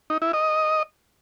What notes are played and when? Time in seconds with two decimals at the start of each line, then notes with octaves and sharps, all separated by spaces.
0.10 D#4
0.22 E4
0.33 D#5